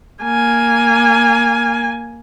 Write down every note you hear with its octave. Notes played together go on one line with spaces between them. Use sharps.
A#3 G#5